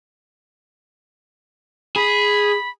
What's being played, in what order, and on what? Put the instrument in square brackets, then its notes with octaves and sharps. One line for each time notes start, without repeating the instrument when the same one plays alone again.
[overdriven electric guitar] G#4 [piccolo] B5